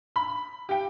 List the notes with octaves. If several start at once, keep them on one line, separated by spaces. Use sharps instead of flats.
B5
G4 G5